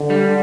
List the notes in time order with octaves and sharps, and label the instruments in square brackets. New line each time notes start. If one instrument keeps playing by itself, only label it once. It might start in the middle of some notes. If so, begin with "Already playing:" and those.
Already playing: [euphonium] D3
[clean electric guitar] G3